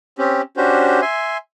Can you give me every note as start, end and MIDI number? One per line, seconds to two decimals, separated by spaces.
0.18 0.41 60
0.18 0.41 61
0.18 0.41 67
0.57 1.01 61
0.57 1.01 62
0.57 1.01 66
0.57 1.01 67
0.57 1.01 72
1.02 1.37 76
1.02 1.37 80
1.02 1.37 84